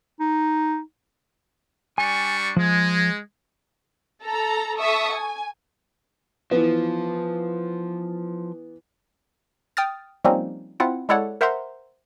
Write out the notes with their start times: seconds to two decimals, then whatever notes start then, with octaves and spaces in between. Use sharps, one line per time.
0.20 D#4
1.98 G3 D4 G#5 C#6
2.56 F3 G#3
4.23 A4 A#5
4.79 A4 E5 C#6 D#6
5.14 G#5
6.51 E3 F3 B3
9.77 G5 D#6 F6 A6
10.24 F3 G3 A#3 C4 C#4 D#4
10.80 C4 E4 F4 F#5
11.09 G#3 E4 A4 C#5 D5 F#5
11.41 A#4 C5 E5 F#5 A#5 C6